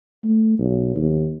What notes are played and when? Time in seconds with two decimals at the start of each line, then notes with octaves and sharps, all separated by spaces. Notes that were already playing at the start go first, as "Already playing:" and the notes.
0.24 A3
0.59 B1
0.96 D#2